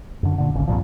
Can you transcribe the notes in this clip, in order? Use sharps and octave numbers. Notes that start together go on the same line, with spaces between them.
F#2 D3
A#2 D3
D1 G#1 C#3
C2 G2 A#2 F3